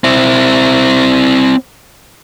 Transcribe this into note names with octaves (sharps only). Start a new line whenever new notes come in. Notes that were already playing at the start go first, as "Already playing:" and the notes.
C4 E4